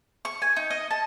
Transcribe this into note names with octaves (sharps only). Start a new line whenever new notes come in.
C#6
G#5
D#4
D#5
A5